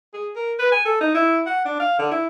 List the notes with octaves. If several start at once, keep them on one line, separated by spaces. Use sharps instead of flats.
G#4
A#4
B4
G#5
A4
D#4
E4
F#5
D4
F5
D3
E4